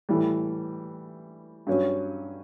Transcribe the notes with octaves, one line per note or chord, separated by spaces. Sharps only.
A2 E3 G3
G2 F#3 C#4